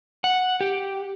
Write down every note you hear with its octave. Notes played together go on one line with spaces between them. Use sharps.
F#5
G4